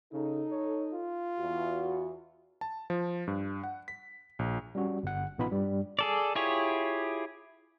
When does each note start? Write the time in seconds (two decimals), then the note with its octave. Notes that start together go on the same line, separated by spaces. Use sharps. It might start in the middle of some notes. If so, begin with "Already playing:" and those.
0.13 C#3 D#4 A4
0.51 C#5
0.93 F4
1.39 E2 F#4
2.61 A5
2.90 F3
3.28 G2
3.64 F#5
3.88 B6
4.39 A#1
4.75 G3 C#4 F#4
5.03 G1 F#5
5.38 A1 B2 B3 D#4 F4 B5
5.51 G2 G3
5.99 G#4 A4 D5
6.35 E4 F4 G4 G#4 C#5